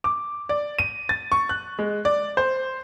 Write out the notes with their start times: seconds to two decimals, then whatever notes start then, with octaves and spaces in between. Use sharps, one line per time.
0.04 D6
0.49 D5
0.79 D#7
1.09 A6
1.32 C#6
1.49 F#6
1.79 G#3
2.05 D5
2.37 C5